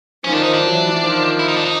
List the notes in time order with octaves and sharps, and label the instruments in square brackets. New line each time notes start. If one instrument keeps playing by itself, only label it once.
[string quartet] D#3 F3 [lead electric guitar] C#4
[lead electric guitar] D4
D#4
D4
[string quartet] E3 F#3
D#3 F3
[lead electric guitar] E4
D#4
D4
D#4